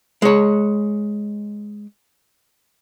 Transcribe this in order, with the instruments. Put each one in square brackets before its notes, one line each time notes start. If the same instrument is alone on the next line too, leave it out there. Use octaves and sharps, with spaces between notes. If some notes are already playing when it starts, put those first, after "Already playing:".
[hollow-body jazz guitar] G#3 C#5